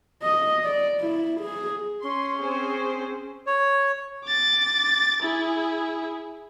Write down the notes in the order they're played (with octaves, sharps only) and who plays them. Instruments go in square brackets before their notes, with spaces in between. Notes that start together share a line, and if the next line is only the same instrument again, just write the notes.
[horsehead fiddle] D#5
D5
E4
G#4
[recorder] C#4 [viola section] C6
[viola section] C4 G#4 C5
[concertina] C#5
[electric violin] D6 A6
E4 G#4